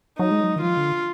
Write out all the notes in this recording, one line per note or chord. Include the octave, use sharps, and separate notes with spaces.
F#3 D#4
G#3
F#3
D#3
F3 F4
D3